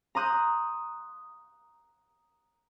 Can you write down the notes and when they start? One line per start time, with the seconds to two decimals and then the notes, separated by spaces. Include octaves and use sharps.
0.15 A#5 C6 D#6 F#6 G6